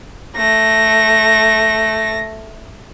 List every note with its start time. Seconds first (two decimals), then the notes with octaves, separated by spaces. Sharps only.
0.36 A3 A#6